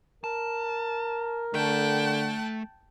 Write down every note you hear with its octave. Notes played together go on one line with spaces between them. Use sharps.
A#4 A5
D3 A3 A4 G5 A5 F#6